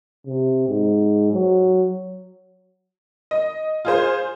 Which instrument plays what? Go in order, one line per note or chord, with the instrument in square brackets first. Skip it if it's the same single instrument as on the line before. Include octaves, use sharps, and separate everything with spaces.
[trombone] C3
G#2
F#3
[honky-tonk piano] D#5
F4 G#4 C5